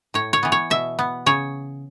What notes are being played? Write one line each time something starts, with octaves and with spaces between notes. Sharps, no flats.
A2 C#5
C#5
E3 B3
C#5
B2 E5
B3
C#3 C#5